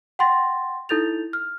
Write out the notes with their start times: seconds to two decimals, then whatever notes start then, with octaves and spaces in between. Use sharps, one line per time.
0.19 F#5 G5 C6 A6 A#6
0.89 D#4 E4 A4 G6 A6 F7
1.33 F6